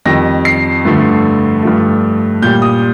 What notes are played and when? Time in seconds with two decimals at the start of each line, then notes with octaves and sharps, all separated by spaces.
0.05 F2 D#3 G3 A#6
0.45 C7
0.85 G2 D3 F3 A3
1.63 G2 F3 A3
2.42 A#2 G3 G6
2.62 D#6